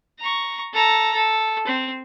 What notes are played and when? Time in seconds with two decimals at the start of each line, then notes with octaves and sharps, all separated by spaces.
0.19 A#5 C#6
0.73 A4 A#5
1.14 A4
1.67 C4